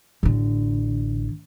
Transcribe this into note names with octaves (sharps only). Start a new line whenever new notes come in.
A1 D3